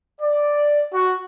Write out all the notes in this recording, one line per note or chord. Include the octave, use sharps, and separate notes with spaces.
D5
F#4